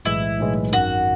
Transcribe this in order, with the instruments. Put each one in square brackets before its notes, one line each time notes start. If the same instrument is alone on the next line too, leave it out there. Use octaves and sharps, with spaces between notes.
[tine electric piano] B1 A2 E3 G#3 [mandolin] E4
[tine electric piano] B1 A2 E3 G#3
[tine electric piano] G#1 F#2 D#3 [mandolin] F#4